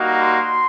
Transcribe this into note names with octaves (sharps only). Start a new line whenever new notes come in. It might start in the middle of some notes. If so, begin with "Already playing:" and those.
Already playing: G3 A#3 D#4 F#4
C6